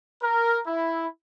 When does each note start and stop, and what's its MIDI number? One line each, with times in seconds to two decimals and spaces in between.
0.23 0.59 70
0.67 1.06 64